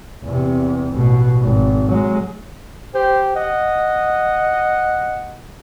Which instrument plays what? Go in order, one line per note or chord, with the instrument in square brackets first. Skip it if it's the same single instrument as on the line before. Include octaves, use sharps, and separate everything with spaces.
[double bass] E2 C3
A1 B2
G#1
F#3 G#3
[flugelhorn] G4 [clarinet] C5
[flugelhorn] D#5 [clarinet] F#5